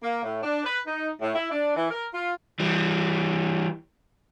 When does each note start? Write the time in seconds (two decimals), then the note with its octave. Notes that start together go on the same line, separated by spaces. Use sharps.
0.02 A#3
0.23 A2
0.43 D4
0.64 B4
0.87 D#4
1.21 A2
1.35 E4
1.51 D4
1.75 E3
1.90 A#4
2.14 F4
2.60 E3 G3